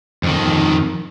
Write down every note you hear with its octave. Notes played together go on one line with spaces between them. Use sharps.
F2 D#3